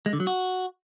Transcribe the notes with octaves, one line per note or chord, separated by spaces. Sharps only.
G#3
D3
F#3
F#4